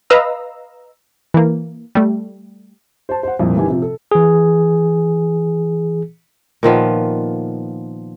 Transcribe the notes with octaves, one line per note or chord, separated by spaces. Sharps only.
B4 D#5 F5 A#5 E6
E3 A#3
G3 A3
C5 A5
C5 F#5
C2 F2 A#2
F#1 D#3 E3 G4 G#5
C3 F3
A4
E3 G#4
A#2 D#3 F3 B3